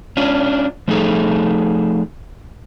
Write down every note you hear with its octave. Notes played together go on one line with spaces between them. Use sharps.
C#4 D4 F4
F3 A3 D#4 G#4 A4